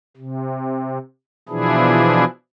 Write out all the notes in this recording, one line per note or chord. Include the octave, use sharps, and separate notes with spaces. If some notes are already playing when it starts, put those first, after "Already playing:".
C3
B2 E3 F3 D4 E4 G#4